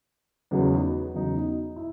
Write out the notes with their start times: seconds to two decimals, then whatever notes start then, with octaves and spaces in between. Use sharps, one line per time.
0.51 E2 C#3 F#3 B3 D#4
1.14 E2 C#3 F#3 B3 D#4
1.76 E4